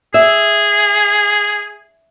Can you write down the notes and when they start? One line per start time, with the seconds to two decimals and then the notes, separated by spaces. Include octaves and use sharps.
0.14 G#4 E5